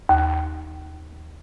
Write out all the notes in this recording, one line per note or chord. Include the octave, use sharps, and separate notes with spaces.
D#2